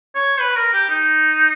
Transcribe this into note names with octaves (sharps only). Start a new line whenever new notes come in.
C#5
B4
A#4
G4
D#4